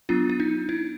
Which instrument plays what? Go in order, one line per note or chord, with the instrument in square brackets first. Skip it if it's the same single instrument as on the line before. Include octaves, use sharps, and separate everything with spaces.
[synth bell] F#3 B3 D4 F4
F4
D#4
E4